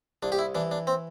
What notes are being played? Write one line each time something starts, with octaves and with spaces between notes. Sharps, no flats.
C2 D4
G4
E4
E3 D4
D4
C4